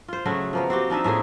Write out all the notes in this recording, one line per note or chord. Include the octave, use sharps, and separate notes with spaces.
F4 C5
C#3 F#3 A3 F#4
F3 A#3 B3
C4 F#4 G4
F3 D4 D#4 E5
A2 A3 A#3 G#4